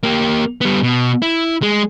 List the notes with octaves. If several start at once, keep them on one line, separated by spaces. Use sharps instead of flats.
A#3 G4
G3 B3
B2
E4
G#3